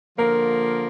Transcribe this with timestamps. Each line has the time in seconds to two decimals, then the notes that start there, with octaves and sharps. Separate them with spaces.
0.18 D3 F3 A#3 F4 A#4